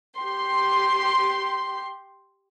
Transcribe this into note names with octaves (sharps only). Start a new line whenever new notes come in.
G4 C6